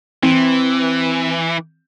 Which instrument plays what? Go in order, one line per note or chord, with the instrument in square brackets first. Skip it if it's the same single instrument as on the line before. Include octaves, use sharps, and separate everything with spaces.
[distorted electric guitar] E3 [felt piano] C4